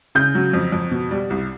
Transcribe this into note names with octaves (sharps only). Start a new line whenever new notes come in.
C#3 G6
F#3
F2
F2
B2
G3
C2